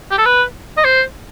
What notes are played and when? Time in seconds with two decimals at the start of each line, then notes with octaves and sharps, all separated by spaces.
0.11 G4
0.18 A4
0.26 B4
0.77 D#5
0.84 C5